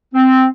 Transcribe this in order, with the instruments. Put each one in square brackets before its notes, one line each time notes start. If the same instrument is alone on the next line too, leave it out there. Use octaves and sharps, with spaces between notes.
[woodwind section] C4